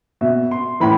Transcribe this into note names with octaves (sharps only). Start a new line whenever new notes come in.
B2 E5
C6
A2 E3 B5